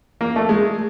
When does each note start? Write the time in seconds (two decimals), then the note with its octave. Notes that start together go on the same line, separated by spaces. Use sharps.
0.21 A#3
0.36 A3
0.49 G#3